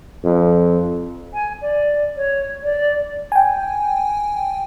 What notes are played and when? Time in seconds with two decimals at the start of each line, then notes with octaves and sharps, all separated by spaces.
0.24 F2
1.33 G#5
1.61 D5
2.16 C#5
2.63 D5
3.32 G5 G#5